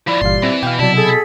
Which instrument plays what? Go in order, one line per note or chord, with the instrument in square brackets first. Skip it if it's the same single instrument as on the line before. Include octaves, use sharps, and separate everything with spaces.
[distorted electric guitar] F3 E4 [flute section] D5
[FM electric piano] G1 E3 F5 [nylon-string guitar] A#2 G3 [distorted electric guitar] C6
[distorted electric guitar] E3 [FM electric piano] C4
[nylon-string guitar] B2 [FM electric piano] F5 G5
[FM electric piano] C3 F#3 [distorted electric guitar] E4 [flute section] D5 A5
[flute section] G#4 A4